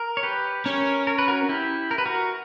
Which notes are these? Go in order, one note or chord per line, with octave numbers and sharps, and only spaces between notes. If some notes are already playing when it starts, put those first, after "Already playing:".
Already playing: A#4
C#5
G4 B4
C#4 A#4 C#5
A#4
B4
F#4 A#4
E4 G4
A#4
B4
F#4 A#4